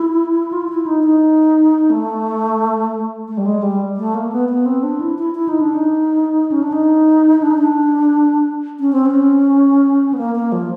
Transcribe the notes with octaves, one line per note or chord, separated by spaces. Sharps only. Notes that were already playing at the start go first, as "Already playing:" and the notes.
Already playing: E4
F4
E4
D#4
D#4
A3
A3
G3
G#3
G3
A3
A#3
B3
B3
C4
D4
E4
E4
E4
D#4
D4
D#4
C#4
D4
D#4
D4
D#4
D4
C#4
C4
C#4
B3
A#3
A#3
F3